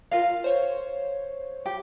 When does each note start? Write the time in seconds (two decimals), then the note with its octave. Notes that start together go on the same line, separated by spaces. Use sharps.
0.11 F4 A#4 F5
0.44 C5 C#5
1.66 G4